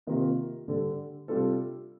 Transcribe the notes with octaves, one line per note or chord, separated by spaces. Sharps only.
C3 D#3 A#3 F4 A#4
D3 G3 D4 A4
C3 G3 D4 F4 A4